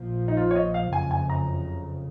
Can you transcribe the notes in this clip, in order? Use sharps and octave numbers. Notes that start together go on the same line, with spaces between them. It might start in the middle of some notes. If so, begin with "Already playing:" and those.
Already playing: A#1 A#2 F3
D#4
F4
C#5
D#5
F5
F#1 F2 C#3 G#5
G#5
A#5